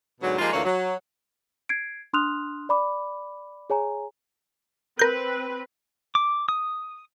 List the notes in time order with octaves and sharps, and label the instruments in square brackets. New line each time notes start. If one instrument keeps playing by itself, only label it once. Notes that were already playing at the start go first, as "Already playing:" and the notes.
[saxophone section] G#2 B2 D3 F#3
F3 G3 G#3 A#3 D#4 F4
D2 D3 E3 A#3 F4 C#5
F#3
[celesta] G#6 C7 D7
D4 C6 D#6 F6 F#6 F7
D5 B5 D6
G#4 C#5 G#5 A#5
[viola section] C4 B4 [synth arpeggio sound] A#4 G6
[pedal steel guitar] D6
D#6